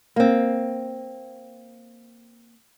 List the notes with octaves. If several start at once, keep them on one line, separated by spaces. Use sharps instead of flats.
A#3 C4